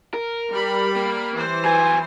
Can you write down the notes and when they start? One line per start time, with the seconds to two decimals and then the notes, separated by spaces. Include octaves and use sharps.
0.14 A#4
0.51 G3 B5
0.96 A#3
1.34 E3 C5
1.65 F#3 B4 G#5